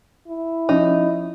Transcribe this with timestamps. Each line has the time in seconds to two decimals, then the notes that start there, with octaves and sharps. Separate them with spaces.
0.27 E4
0.69 F3 C#4 D#4